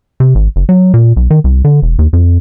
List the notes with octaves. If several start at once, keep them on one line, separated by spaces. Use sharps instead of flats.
C3
G#1
F#1
F#3
A#2
B1
D#3
C2
D3
E1
D#2
F2